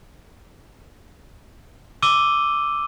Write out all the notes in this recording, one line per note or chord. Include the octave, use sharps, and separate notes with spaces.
D6 E6 D#7 G7